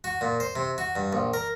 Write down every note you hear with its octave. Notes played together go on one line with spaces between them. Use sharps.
F#4
A#2
C5
C3
F#4
G2
A#1
A#4